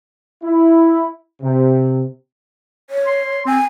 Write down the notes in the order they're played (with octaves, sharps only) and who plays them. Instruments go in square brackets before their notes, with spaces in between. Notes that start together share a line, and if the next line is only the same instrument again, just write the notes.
[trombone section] E4
C3
[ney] C#5
[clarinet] C6
[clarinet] C4 [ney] G#5